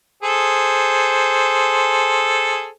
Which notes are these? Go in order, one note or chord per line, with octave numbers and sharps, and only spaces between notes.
G#4 A4 C5